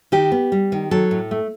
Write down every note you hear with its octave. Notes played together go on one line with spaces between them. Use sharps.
D#3 G4
B3
G3
D#3
F#3 A4
A2
A3